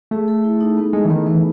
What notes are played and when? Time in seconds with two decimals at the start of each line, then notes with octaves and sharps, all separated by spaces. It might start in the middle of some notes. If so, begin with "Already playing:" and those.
0.11 A3 G#4
0.28 A4
0.44 E4
0.61 D#4
0.77 B3
0.93 G#3 A3
1.05 E3
1.10 D#3 B3
1.26 E3 B3